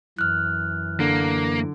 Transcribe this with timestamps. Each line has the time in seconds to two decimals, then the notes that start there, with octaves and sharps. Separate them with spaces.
0.18 F#2 E3 F6 F#6
1.00 D3 A#3